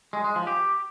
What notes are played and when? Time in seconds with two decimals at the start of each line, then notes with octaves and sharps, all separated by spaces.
0.13 G#3
0.24 G#3
0.36 F3
0.47 G4